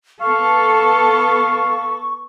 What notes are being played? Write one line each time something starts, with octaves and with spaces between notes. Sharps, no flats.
B3 A4 F5 C#6